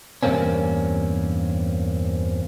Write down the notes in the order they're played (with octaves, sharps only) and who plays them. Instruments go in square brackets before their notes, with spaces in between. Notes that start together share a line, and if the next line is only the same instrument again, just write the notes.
[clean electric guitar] E2 G2 C3 A#3 C4 C#4